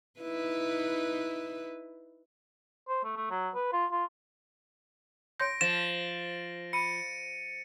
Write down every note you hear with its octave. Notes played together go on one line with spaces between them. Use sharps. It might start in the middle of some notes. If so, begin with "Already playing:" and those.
D#4 E4 B4
C5
A3
A3
F#3
B4
F4
F4
C#5 C6 G6 A#6 D7
F3 A6 E7
B5 C#7 D#7